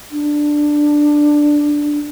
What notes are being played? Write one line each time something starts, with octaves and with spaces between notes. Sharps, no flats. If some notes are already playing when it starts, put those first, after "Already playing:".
D4